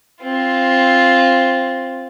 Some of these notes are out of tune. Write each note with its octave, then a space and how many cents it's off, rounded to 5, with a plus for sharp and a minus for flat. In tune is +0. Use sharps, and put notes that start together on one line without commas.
C4 +10 F4 +0